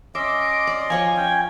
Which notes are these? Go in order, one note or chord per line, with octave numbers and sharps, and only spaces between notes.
C#4 D#5 E5 C6 D6
D5
F3 C#5 D#5 G#5
C#4 G5